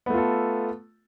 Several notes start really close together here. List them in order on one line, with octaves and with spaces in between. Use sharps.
B3 A3 F4 A4